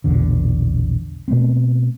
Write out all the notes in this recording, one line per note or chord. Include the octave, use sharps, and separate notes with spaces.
A#1 E2 B2 D3
B2 A3 B3 C4